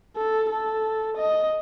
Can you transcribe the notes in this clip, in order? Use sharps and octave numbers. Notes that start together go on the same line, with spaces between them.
A4
A4
D#5